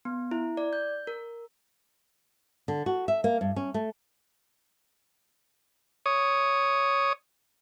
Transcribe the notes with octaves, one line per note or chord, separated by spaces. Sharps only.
B3
E4
D5
G6
A#4
D3
F#4
E5
A#3
G2
C#4
A3
C#5 D#6